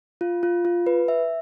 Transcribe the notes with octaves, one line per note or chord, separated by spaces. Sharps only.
F4
F4
F4
B4
E5